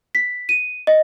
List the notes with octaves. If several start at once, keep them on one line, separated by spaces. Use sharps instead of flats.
B6
D#7
D#5